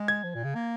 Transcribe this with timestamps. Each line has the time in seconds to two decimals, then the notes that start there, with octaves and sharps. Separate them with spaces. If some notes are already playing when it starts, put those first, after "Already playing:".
Already playing: G#3
0.08 G#6
0.24 F3
0.34 A#2
0.44 C#3
0.55 A#3